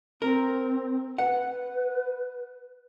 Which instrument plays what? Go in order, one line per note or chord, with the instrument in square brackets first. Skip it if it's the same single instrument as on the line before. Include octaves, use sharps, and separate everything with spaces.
[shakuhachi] C4 [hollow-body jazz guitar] A#4
[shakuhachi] B4 [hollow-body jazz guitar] F#5